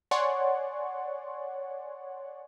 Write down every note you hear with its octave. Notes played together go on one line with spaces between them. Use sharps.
C#5 D5 F#5 G#5 C6 C#6